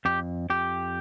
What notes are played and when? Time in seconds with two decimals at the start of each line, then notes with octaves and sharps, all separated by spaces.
0.05 F2 G4
0.50 F2 G4